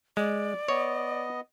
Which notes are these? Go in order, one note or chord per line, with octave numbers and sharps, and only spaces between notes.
G#3 D5
B3 C#5 D#5